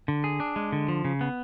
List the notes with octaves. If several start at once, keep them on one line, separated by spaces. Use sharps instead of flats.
D3
G#4
D4
G#3
D3
F3
C#3
B3